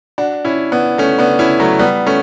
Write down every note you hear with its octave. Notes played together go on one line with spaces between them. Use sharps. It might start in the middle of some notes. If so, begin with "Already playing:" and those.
D4 F#4
C#4 E4
B3 D4
A3 C#4
B3 D4
C#4 E4
F#3 A3
G3 B3
A3 C#4